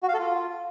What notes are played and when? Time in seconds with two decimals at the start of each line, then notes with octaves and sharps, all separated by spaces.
0.03 F#4
0.08 F5
0.14 A4
0.19 F4